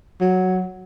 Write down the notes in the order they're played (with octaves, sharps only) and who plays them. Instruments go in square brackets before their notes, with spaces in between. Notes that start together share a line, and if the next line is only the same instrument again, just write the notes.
[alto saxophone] F#3